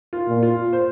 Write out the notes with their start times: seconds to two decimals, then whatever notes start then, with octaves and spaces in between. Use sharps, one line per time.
0.13 F4
0.28 A#2
0.43 F4
0.73 C5